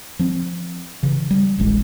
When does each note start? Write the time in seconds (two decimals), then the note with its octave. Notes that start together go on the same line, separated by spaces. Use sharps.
0.19 F3 C4
1.03 C#3 E3
1.31 G3
1.58 D1 A1 G#3